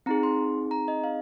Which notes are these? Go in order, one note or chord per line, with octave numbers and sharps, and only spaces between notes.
C4 D#4 G#4 A#5
C6
A#5
D#5
F5